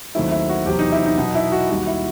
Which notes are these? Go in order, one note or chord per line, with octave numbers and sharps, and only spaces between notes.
D#2 D#3 F#3 A3 C4 E4
E4
F#4
E2 C3 F#3 G4
D#4
E4
D#4
B2 F#3 B3 D#4
E4
F#4
D#2 D#3 G3 F#4
E4